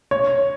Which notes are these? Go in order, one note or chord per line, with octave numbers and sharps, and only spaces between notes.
C#5